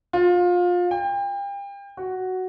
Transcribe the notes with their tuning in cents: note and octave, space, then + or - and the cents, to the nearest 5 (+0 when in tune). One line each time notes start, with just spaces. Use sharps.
F4 +25
G5 +35
F#4 +5